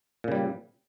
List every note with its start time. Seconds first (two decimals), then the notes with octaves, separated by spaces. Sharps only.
0.24 A#2
0.28 C#3
0.32 G3